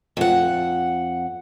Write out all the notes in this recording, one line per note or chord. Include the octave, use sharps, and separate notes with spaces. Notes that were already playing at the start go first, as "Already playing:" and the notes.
F2 F#5